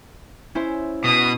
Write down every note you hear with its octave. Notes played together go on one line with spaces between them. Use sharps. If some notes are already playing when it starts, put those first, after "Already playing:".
C#4 E4 C5
B2 D#6